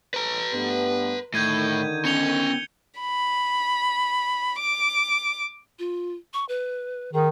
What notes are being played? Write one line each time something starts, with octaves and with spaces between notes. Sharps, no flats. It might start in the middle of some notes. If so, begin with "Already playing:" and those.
B4 A#5
G2 A3 B3
A2 D3 D#3 G6 G#6 D#7
B3 C#4 C#7 F7 G7
B5
D6
F4
C#6
B4
D#3 G#4